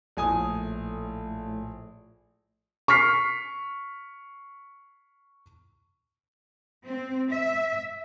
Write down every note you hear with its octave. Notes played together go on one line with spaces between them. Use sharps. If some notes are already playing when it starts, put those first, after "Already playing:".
A#1 A2 G#5 D#6
C#6 F6 B6 C7
C4
E5